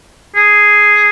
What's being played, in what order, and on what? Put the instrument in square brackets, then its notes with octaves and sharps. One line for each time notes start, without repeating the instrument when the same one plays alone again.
[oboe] G#4